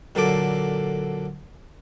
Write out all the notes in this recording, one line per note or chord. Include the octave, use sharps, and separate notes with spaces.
A#2 D3 F#3 A#3 A4 D6